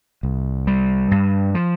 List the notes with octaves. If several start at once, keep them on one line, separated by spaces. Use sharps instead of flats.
C2
G3
G2
F3